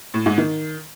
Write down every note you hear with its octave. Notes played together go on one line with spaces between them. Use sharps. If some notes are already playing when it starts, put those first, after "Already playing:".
A2
G#2
D#3